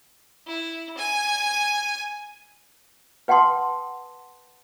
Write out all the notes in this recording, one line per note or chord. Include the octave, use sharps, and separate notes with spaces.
E4
G#5
B4 F#5 G5 A5 C6 D#6